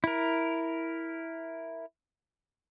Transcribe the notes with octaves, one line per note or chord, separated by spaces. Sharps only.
E4 A#4